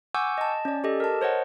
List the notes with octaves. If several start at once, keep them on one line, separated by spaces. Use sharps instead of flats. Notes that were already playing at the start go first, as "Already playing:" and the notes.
F#5 G#5 C#6 D6 E6 G6
D#5 A5
C#4 D5
G4 A4 D#5
A#4 A5
C5 C#5 D#5 F#5